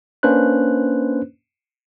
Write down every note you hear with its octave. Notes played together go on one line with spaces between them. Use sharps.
A#3 C#4 D4 B4 C5 F#6